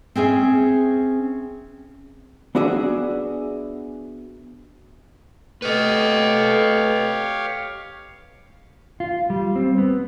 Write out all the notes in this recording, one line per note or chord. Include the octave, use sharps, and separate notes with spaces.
C4 C#4 G#4 E5
B3 D4 F#4 G#4 E5
A3 G4 B4 C#5 D#5 F5
F4
G3
C4
B3